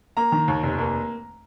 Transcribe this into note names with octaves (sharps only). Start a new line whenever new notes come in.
A#3 A#5
D#3
D#2
F1
A#3